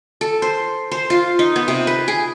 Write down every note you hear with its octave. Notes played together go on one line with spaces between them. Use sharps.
A4
C5
C5
F4
D#4
B3
C3
B4
G#4